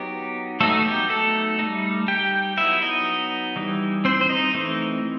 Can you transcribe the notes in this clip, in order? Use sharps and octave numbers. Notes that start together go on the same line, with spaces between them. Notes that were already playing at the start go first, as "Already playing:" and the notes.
Already playing: F#3 B3 D#4 G4
F#3 A3 B3 D#4 A4
G4
A3 A4
G3 D#4
G4 G5
F#3 B3 D#4 E4 E5
D#4 D#5
E3 G3 D#4
C4 C5
C5
D#4 D#5
E3 A3 C4 D#4